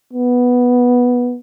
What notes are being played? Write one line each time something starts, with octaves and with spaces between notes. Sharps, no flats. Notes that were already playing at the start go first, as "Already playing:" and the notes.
B3